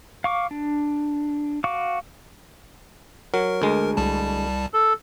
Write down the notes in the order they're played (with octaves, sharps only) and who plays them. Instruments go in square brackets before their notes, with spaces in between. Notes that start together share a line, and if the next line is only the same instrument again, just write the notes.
[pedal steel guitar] F5 C#6 D6
D4
F#4 F5 C#6 D6
[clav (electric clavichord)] F#3 [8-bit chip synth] A#4
[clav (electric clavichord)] D2 G#3
[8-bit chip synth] C2 G3 A5
[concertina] A4